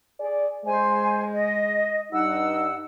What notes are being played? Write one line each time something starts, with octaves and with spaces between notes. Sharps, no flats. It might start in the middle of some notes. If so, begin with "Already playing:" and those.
G#4 D5
G#3 C5 G#5
D#5
G2 D#4 F#5 E6